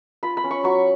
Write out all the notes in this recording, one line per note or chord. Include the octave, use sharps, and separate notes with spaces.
F4 B5
B5
C#4
C#6
F#3 C#6